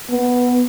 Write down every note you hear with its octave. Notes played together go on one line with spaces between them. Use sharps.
B3